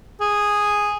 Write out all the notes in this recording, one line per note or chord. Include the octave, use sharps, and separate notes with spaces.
G#4